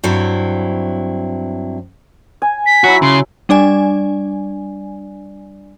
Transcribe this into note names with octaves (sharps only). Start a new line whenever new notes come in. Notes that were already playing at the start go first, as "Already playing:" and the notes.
G2 F#3 C4 E4
G#5
B6
F#3 E4 F#4
C#3 C6
G3 D4 D5 G#5